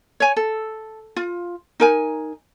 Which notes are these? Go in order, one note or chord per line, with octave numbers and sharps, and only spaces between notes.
C#5 G#5
A4
F4
D#4 A#4 G#5